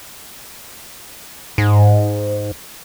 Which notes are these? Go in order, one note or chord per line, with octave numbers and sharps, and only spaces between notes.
G#2